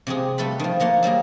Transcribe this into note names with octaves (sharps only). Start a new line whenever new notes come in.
C3 G#3 G4 G#4
G3 A3 A4 B4 B5
D#3 F3
F3 A#3 F#5 C6
F#3 G3 A#3 G#4